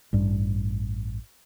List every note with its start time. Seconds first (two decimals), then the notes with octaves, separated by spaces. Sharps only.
0.13 A1 G2 G3